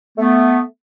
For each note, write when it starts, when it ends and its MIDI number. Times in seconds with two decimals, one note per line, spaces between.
0.18 0.60 57
0.18 0.60 59